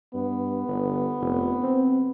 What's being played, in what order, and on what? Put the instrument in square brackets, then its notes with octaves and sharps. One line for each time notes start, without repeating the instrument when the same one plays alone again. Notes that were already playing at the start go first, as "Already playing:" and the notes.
[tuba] G2 [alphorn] B3
[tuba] G1
F1
C4